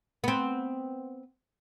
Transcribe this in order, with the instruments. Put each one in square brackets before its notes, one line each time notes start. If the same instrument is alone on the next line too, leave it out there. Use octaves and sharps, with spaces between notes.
[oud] B3 C4